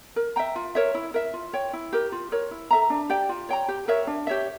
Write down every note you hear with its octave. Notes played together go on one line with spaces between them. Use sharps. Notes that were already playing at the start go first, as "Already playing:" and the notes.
A#4
E5 G5 A#5
F4
A#4 C#5 E5
E4
A#4 E5
F4
C#5 G5
E4
G4 A#4
F4
A#4 C#5
E4
A4 E5 A#5
D4
G4 D5 G5
F4
C#5 G5 A#5
G4
A#4 C#5 E5
D4
G4 C#5 E5